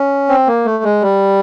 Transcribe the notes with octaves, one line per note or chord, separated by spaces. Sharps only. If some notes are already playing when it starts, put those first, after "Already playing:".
Already playing: C#4
C4
A#3
A3
G#3
G3